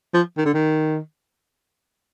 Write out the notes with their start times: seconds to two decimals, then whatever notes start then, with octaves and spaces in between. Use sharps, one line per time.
0.14 F3
0.37 D#3
0.45 D3
0.54 D#3